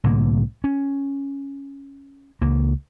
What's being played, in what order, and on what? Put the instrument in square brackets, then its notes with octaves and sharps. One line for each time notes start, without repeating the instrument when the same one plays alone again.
[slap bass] C2 A2 D3 A#3
C#4
C#2 A#3